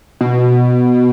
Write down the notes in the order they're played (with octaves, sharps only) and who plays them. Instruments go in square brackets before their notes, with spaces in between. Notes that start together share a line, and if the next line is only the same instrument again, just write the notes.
[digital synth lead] B2